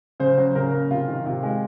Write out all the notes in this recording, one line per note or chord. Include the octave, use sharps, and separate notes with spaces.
C#3 C5
F#3
C#3 A#4
A#3
C3 F4
D#3
C3 F4
G#3